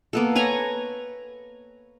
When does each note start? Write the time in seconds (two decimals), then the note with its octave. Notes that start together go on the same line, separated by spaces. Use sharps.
0.13 A#3 B3 A4
0.35 B4 C#5 G#5 A#5